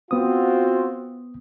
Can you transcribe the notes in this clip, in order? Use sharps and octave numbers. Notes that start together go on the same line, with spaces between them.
B3 C4 F4 F#4 D#6